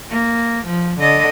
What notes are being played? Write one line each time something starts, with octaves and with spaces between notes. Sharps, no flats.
A#3
F3
D3 D#5